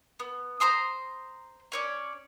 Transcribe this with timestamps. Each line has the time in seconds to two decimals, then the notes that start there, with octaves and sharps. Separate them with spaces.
0.20 B3
0.60 C5 A#5 C6 D#6
1.72 C#4 C#5 D5